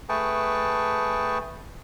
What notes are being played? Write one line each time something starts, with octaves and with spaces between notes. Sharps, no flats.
A3 G#4 B4 G5 A5 C#6